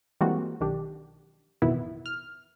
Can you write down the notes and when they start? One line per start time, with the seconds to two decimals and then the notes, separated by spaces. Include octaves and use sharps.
0.21 E3 G3 G#3 A#3 C4 F#4
0.60 B1 D#3 D4 G4
1.62 A1 F2 B2 D#3 B3 E4
2.06 F6